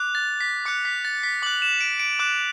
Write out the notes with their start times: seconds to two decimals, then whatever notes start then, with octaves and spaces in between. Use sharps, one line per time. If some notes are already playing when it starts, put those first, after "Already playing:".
Already playing: D6 F#6
0.15 A6
0.41 B6
0.66 D6 F#6 C#7
0.85 B6
1.05 A6
1.23 B6
1.42 D6 F#7
1.46 F#6
1.62 E7
1.81 D7
2.00 D7
2.19 D6 F#6 E7